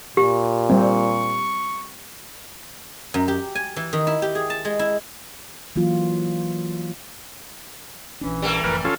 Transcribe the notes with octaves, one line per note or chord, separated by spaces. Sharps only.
A#2 G4
G3 C4 C#6
F#2
G4
G#5
E3
D#3
E4
G4
G#4
A5
G#3
E4
E3 F#3 A#3 F4
A#1 E3 C#4 D4
G3 A3 A#3
F#1 F2 A2 A#4 B4
C#4 F4 A4